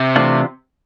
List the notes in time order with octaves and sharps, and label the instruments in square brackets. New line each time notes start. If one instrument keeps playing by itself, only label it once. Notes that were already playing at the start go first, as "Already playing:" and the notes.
Already playing: [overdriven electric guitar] C3
[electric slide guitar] E3 A3 D4 F4